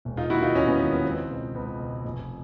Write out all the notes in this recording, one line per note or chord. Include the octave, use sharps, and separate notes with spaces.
E1
D#4 F4
D#2 D#3 E4 F#4
D#4 F4
E1 C#4 D#4
B3 C#4
D#2 D#3
B3
C#2 C4
B2
C#2 B3
B2
F1